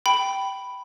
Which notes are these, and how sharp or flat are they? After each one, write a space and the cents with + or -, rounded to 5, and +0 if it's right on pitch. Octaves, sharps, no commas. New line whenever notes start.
G5 -15 B5 +0